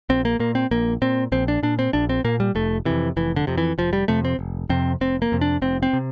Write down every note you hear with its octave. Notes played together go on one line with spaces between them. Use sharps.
A#1 C4
A#3
A#2 A#3
C4
A#1 A#3
A#2 C4
A#1 C4
D4
A#2 D4
C4
A#1 D4
C4
A#2 A#3
G3
F1 A3
F2 C3 E3
F1 E3
D3
F2 C3
E3
F1 F3
G3
F2 C3 A3
C4
F1
F2 C3 C4
F1 C4
A#3
F2 C3
D4
F1 C4
C4
C3